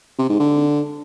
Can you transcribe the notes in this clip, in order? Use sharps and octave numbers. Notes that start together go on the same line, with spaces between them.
C3
G#2
D3